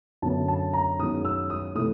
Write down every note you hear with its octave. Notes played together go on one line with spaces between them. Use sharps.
F#2 D3 F#3 B3 A5
A5
A#5
F#2 D#3 G#3 B3 D#6
E6
D#6
C3 E3 A3 D#6